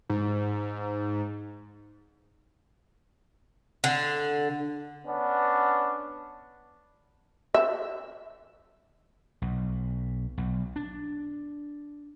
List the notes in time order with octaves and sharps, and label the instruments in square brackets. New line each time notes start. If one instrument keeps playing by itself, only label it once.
[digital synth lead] G#2
[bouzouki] D3
[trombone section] B3 C#4 D4
[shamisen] E5
[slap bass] B1
B1
D4